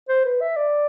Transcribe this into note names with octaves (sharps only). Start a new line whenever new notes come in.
C5
B4
E5
D5